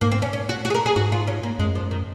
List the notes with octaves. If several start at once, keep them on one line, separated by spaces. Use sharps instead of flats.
G#2 A#3
C4
C#4
C#4
F#4
F#4
G#4
A#4
G#4
G#2 F#4
F4
C#4
A#3
F#2 G#3
F3
D#3